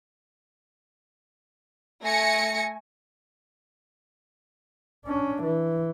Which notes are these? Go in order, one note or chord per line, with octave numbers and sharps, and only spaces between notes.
A3 G#5 A#6 C#7
C#4 D4
E3